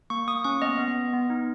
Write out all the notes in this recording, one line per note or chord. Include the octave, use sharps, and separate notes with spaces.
A#3 C#6
A#3 D#6
C#4 C#6
B3 D#5
B3
B3
B3
D#4